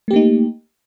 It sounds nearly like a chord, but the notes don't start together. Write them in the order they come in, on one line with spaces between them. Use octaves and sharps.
A3 G4 A#3 D#4